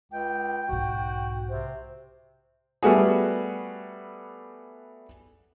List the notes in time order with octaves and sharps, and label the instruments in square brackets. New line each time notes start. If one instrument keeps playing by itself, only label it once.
[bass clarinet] C#2 [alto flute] G5
[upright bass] B1 G#2 [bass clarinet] F#4
[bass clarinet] C3 [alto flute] C5
[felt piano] G3 A3 B3 F#4 G#4